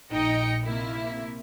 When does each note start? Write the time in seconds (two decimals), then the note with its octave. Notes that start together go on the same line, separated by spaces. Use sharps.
0.12 A#1 D#4 D#5 G5 A#6 C#7
0.63 C3 A#3 E4